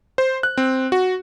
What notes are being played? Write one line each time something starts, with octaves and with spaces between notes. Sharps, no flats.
C5
F#6
C4
F#4